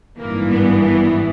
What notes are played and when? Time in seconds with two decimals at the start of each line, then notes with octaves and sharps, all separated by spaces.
0.19 G#1 G2 E3 A#3
0.50 B3
0.81 B3